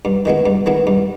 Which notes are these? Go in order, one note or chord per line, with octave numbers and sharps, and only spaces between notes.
G2
D#3 G#3 B3 E4
G2
D#3 G#3 B3 E4
G2